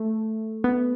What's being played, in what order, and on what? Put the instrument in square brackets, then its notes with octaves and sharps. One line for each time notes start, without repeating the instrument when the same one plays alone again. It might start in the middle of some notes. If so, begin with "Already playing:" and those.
Already playing: [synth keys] A3
B3